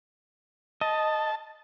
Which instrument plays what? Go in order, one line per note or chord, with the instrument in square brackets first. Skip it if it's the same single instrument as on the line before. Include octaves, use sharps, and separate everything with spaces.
[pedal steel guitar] D#5 [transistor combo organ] A5